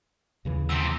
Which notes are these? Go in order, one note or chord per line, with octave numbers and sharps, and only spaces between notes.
D#2 C#3 E3
E2 C3 E6 G6 D7